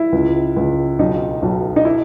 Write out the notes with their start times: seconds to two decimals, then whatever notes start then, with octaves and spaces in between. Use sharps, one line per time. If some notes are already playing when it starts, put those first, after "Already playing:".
Already playing: E4
0.12 C#2
0.56 C#2
0.99 B1 D#4
1.42 B1
1.76 D#4
1.85 E4